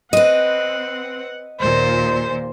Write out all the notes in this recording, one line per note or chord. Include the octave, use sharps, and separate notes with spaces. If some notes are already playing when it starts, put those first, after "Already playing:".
C4 B4 D#5 F#5
D#2 A#2 C5